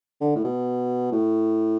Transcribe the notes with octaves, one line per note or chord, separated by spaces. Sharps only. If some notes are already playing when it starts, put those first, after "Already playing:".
D3
A2
B2
A2